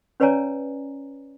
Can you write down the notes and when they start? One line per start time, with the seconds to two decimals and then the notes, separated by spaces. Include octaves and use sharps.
0.20 C#4 B4 C#5 D5 G#5 A#5